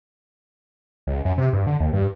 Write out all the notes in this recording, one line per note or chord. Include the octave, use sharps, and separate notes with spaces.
C#2
F#2
C3
G2
D3
D#2
G2